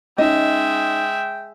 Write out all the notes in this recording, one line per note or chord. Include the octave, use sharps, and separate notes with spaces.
G#3 C#4 D#4 D#5 E5 G5